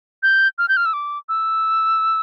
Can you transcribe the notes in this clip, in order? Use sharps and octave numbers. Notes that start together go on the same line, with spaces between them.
G6
F6
G6
F6
E6
D6
E6